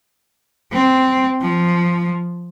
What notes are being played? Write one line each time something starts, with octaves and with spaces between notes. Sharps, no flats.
C4
F3